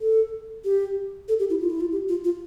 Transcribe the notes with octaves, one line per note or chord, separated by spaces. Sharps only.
A4
G4
A4
G4
E4
F4
E4
F4
G4
F4
F4